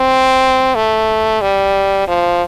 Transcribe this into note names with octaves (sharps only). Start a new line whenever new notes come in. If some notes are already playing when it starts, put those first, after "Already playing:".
Already playing: C4
A3
G3
F3